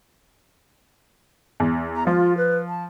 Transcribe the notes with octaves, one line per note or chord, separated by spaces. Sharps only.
E2
A#5
F3 F4
B4
A5